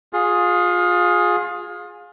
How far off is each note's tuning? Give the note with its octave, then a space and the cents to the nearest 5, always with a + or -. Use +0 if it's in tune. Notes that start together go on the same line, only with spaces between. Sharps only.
F4 +25 G#4 +0